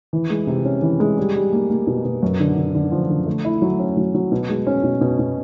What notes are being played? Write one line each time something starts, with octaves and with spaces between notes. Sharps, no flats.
E3
G#3
C3
C#4
E3
G#3
G3
G3
A#3
A#3
B2
B2
F#2
D3
D3
D3
F3
D3
A3
E4
F#3
C#4
F#3
F#3
B2
G#3
C#4
B2
B2
B2